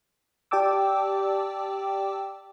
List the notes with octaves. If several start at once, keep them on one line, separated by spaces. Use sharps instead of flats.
G4 D5 G5 A5 D6 E6